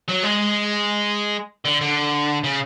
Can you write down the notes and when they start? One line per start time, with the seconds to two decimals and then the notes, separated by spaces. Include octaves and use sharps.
0.09 F#3
0.24 G#3
1.65 D3
1.81 D3
2.44 C#3